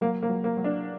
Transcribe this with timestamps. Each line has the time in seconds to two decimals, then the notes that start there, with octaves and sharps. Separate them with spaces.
0.01 F#3 A#3
0.23 A#3
0.29 F#3
0.44 A#3
0.57 F#3
0.64 D4